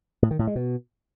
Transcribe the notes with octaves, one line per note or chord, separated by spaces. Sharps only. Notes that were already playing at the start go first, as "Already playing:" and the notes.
A2
D#3
A2
G#3
B2